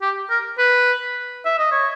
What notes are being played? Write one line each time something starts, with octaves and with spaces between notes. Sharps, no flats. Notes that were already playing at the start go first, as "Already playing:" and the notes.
G4
A#4
B4
E5
D#5
C#5